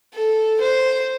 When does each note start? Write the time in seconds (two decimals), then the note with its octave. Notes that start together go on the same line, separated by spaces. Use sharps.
0.14 A4
0.61 C5